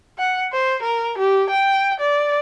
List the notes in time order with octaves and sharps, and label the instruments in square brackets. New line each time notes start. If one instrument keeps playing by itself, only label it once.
[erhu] F#5
C5
A#4
G4
G5
D5